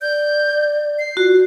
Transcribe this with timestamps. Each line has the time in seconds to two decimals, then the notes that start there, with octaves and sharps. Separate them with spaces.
0.01 D5 G6
0.99 C7
1.17 F4 F#4